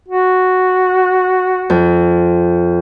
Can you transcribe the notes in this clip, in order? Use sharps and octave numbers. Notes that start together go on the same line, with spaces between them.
F#4
F2